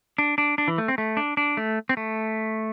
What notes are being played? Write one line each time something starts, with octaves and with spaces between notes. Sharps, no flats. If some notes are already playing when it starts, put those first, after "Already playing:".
D4
D4
D4
E3
A3
C4
A3
D4
D4
A3
C4
A3